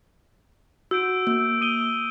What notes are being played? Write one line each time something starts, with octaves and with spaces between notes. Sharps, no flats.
F#4 E6 G6 D7
A#3
D#6 D#7 G7